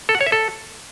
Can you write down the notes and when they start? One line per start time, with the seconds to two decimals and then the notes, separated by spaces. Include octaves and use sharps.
0.09 A4
0.15 F#5
0.21 C#5
0.26 E5
0.32 A4